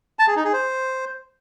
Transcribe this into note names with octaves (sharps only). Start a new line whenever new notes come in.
A5
G#4
D#4
G#4
C5